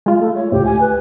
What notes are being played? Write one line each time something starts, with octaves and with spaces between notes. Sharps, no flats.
G#3 F4
A3
C#5
D2 A2 G4
G#5
B4